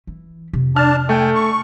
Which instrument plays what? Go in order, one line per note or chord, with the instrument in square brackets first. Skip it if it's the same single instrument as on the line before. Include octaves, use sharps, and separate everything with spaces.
[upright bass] E3
F2 C3
[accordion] D4 A5 [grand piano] F6
[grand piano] A3 [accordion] G5 G#5
[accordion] C#6